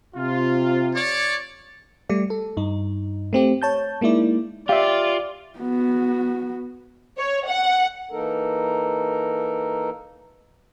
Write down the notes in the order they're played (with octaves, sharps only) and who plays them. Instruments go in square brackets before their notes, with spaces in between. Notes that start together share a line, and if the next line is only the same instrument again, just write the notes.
[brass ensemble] C3 F4
[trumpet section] C#5 D5
[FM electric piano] G3 A3 D5
A4
G2 D#4
A3 C4 G4
C#5 A5 G6
G#3 A#3 D#4 E4 D5
[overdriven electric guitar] F4 [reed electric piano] G4 E5 [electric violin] D5 [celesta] F5
[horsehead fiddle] B3 F#4
[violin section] C#5
F#5
[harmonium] E3 A#3 D#4 A4 A#4